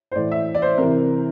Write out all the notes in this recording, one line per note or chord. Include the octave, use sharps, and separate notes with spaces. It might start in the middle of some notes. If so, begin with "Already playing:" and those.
C5
A2 E3 D5
E5
D5
C5
C3 E3 A#4